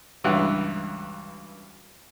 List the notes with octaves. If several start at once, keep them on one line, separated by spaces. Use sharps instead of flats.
C#2 G2 E3 F#3